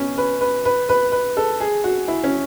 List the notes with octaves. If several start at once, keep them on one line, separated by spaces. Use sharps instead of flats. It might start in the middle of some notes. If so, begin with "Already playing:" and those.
Already playing: B3 C#4
B4
B4
B4
B4
B4
A4
G#4
F#4
E4
C#4